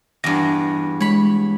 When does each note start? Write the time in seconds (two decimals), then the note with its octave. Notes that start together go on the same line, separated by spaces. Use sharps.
0.24 E2 G2 A#6
1.00 G#3 C#5 B5